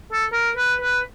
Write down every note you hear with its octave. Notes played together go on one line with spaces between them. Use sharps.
A4
A#4
B4
B4